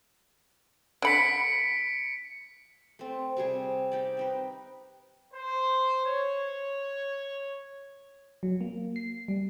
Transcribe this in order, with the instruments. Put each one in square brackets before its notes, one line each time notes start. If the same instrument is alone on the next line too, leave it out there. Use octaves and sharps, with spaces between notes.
[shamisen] D3 B5 [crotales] B6 C#7 D7
[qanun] A3 C4
C3 G3 G#4 C#6
D#4 G4 D5
C4 D#4 B4
[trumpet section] C5
C#5
[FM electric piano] F#3
A#3
C7
G3